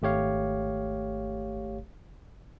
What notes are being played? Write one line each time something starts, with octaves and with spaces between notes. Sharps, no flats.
G#1 A3 G4 C#5 F5